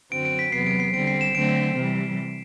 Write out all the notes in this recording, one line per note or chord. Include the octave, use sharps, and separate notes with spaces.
F#2 D3 F#3 C4 F#4 D7
D7
B6
E2 C3 F#3 B3 C7
D7
C7
D3 G3 C4 D7
C7
E7
D3 F#3 A3 C4 D7
C3 E3 G3